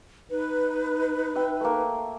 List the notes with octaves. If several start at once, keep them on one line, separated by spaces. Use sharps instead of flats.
D#4 B4
E5 G5
A3 A#3